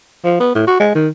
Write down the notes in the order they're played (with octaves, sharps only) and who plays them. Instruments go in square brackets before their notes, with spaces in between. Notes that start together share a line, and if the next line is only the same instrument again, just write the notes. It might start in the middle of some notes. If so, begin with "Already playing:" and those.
[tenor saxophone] F3
B3
A2
F#4
G#3
D#3